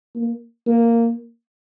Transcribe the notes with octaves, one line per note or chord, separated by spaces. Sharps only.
A#3
A#3